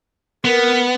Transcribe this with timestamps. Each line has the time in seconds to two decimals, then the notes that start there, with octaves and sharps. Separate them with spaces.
0.45 B3 A#4